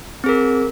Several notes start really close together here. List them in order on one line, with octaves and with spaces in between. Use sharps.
C4 G#4 A#4